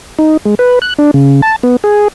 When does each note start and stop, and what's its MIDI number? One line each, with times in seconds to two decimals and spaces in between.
0.19 0.37 63
0.45 0.55 56
0.59 0.79 71
0.82 0.94 90
0.99 1.11 62
1.14 1.41 49
1.42 1.56 81
1.63 1.76 59
1.84 2.08 68